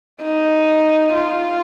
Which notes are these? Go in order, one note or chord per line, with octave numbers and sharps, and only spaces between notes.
D#4
F4